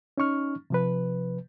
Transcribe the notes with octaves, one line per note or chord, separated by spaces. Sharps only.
C#4 D#4 C#6 F6
C3 F3 B4